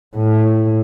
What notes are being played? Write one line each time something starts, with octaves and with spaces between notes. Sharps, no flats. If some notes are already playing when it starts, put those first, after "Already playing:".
A2